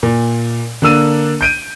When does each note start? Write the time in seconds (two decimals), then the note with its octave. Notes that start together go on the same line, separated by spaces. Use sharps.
0.03 A#2
0.82 D3 A#3 D4 E6 D#7
1.41 G6 D7 D#7